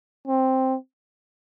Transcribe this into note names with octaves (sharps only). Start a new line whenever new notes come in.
C4